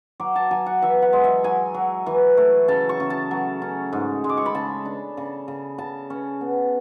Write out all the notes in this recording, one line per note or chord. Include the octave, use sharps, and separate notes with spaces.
F#3 D6
A5
F#3 G#5
F#5
E3 E5
F#5
G#3
E5
F#3 G#5
F#3
E3
A3
C#3 A5
C#6
C#3
A5
F#3
C#4
G#2
G#3
D6
C#6
B5
C#3 A5
D4
C#3
C#3
C#3 A5
C#4
B3